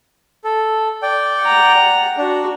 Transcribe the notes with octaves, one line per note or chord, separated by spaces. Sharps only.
A4
D5 G5
F#5 A#5
D4 F#4